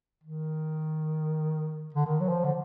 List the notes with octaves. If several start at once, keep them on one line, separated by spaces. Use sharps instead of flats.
D#3
D3
D#3
F#3
F3
D3